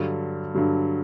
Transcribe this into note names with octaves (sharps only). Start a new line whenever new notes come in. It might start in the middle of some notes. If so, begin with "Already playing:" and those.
Already playing: G2 D3 F#3
G2 D3 F#3